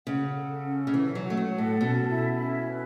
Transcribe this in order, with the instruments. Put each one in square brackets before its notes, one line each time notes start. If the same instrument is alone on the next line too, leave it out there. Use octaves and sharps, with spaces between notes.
[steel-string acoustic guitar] C#3 [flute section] F#5
[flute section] A4
C#4
[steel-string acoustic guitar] C#3
[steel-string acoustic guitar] E3 [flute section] C#5
[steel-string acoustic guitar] F#3
[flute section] F#5
[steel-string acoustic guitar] A3
F#3
[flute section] A4
[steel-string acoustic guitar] A2
[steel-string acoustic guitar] B2 [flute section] C#4
[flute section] E4
C#4
B4